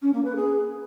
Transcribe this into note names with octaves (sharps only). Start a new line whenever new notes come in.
C#4
A#3
B4
G#4